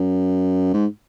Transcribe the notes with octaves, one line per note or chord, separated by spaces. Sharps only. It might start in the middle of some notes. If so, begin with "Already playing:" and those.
Already playing: F#2
G#2